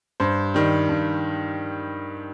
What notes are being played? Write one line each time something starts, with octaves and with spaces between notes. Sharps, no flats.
G2 C5
D#3 G3
G2